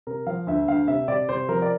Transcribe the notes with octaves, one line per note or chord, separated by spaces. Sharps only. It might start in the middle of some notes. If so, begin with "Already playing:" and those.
C3 A#4
F3 F5
D2 E5
D2 F5
C3 E5
C3 D5
C3 C5
F3 A#4
D5